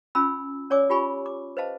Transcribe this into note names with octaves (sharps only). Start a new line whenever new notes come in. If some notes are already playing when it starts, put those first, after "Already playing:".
C#4 F4 G#5 B5 E6
C#4 C#5 D5 G#5 D6 E6
F4 G4 G#5 B5 C#6
D6
B4 C5 D#5 F5 A5